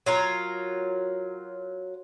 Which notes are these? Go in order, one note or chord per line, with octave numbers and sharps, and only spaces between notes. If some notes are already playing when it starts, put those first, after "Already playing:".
F#3 F4 A#4